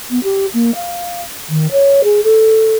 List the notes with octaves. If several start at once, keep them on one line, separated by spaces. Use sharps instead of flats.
B3
G4
A#3
F5
D#3
C#5
G#4
A4